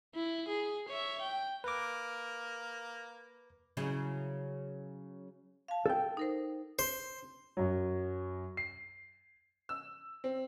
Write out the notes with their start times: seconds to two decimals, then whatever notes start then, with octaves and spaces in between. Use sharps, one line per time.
0.16 E4
0.48 G#4
0.88 C#5 E5
1.21 G5
1.64 A#3 B4 D6
3.77 C#3 F#3 E4
5.68 F5 A5
5.86 A4 G5
6.17 D#4 A#4 C5
6.79 C5
7.57 F#2 F#3
8.57 C7
9.69 E6
10.24 C4